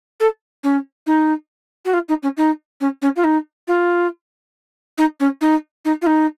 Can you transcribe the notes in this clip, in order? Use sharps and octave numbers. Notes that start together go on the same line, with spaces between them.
A4
C#4
D#4
F#4
F4
D#4
C#4
D#4
C#4
C#4
F4
D#4
F4
D#4
C#4
D#4
D#4
F4
D#4